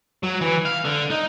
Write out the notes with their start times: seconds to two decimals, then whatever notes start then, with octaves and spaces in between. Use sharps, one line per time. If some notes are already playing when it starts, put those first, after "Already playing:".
0.23 F#3
0.41 E3
0.65 F5
0.85 D3
1.10 D#4